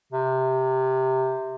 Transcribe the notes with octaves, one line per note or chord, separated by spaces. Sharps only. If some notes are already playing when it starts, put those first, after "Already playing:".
C3